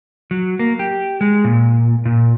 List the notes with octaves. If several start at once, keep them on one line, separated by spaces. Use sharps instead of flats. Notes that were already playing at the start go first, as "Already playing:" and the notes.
F#3
A#3
G4
G#3
A#2
A#2